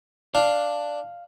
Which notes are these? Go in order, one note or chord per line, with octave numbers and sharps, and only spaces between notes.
D4 F5